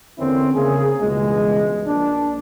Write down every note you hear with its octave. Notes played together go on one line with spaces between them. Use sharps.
E2 D3 A#3 C4 C#4 E4
C#3 A#3 G#4
C#2 G2 B2 E3 G#3
A#1 D4